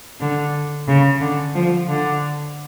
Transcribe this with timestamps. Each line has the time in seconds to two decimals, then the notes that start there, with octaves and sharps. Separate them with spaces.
0.20 D3
0.88 C#3
1.21 D3
1.55 F3
1.88 D3